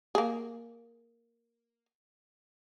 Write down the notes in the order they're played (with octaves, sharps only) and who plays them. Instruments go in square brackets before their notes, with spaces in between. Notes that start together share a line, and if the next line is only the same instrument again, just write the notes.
[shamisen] A#3 G#4